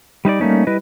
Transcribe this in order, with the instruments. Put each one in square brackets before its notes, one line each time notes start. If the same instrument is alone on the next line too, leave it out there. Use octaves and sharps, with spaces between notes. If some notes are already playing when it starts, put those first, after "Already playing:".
[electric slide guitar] G3 D#4 B4 D5
G3 A3 A#3 C#4 D#4
G3 E4 B4 D#5